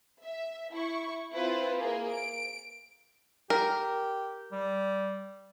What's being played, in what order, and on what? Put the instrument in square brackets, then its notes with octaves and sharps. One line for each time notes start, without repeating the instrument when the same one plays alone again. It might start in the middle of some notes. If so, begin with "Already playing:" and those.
[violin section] E5
E4 C#6
C4 E4 F4 B4 C5
A#3 G#4 A#4
D7
[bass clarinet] G4 [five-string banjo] A#4
[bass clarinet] G3